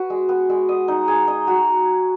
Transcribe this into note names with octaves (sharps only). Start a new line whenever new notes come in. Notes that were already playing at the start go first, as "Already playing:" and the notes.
Already playing: F#4 B4
G#3
B3
G#3
D#5
D#4
G#4
D#4
F#4